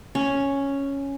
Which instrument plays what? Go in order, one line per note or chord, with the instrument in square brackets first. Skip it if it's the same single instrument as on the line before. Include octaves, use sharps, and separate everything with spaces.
[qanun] C#4